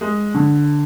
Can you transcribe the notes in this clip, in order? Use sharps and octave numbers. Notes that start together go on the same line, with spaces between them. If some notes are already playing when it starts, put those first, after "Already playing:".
G#3
D3